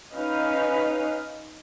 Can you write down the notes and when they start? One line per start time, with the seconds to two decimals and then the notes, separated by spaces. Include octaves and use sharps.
0.14 C#4 D#4 B4 F5